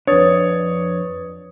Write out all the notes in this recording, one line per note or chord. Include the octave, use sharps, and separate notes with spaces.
F2 D4 B4 C#5 D#6 A6